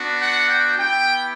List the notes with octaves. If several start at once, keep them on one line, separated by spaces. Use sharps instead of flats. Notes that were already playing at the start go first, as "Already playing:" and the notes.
Already playing: B3 D4 F#4
F#5
G5
B3 E4 G4 G5